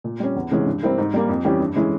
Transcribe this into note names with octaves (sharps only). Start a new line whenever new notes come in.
A#2
G3 C#4
E2
C3 E3 G#3 C#4
G2
G3 C4 E4 A#4
G#2
G3 A#3
F2
E3 G3 C#4 G4
G2
E3 G#3 C#4 E4